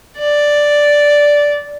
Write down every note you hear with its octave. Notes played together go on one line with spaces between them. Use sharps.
D5